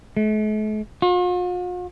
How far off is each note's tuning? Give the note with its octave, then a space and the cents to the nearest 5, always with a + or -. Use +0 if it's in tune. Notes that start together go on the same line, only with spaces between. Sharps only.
A3 -45
F4 +45